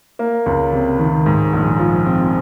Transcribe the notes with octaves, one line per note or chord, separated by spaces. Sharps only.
A#3
C#2
C3
D#3
G#2
A#1
F3
C4